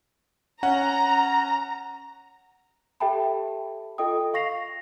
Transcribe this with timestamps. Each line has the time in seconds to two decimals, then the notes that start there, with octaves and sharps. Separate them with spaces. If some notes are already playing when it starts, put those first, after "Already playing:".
0.63 C#4 F#5 A#5
3.00 G4 A4 E5 G5 A5 B5
3.98 F4 A4 D#5 G5 D#6
4.34 F5 C#6 A#6 C7 F7